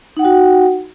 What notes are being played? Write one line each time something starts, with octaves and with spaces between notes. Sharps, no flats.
D#4 F#4 F#5 G5